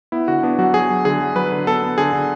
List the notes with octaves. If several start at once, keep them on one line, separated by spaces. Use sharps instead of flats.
B3 E4
D3 F#4
B3 D4
F#3 F#4
F#3 G#4
F#3
D3 G#4
F#3
F#3 B4
D3
B3 A4
B3
D3 G#4
D3